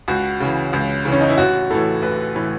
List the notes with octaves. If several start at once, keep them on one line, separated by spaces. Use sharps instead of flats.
C#2 F#4
C#3 E3
C#2
C#3 E3
C#4
D#4
E4
A1 F#4
A2 E3 A4
A1 B4
A2 E3